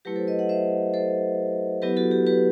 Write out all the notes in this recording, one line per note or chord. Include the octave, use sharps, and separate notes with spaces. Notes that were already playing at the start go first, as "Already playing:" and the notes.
F#3 A3 E4 G4 B4
A4 C5
B4 D#5
D#5 F#5
C5 E5
A4 C5
F#3 B3 E4 G4 B4
F#4 A4
G4
G4 B4